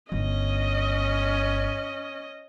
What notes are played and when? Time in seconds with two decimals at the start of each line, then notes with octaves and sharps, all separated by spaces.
0.12 G1 C#4 D#5